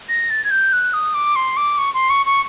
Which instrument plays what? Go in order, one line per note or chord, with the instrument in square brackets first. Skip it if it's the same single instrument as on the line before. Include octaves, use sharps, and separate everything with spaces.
[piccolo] A#6
A6
G#6
G6
F#6
D#6
D6
C6
D6
C#6
C6
C#6
C#6